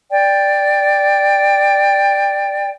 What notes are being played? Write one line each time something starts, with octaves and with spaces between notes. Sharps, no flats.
D5 G5